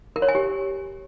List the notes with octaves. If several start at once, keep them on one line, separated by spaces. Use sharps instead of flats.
A#4
C#5
G#5
G4